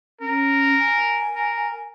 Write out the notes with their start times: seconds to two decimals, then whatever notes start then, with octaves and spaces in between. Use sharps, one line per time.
0.21 C#4 A#4
0.80 G#5
1.35 A#4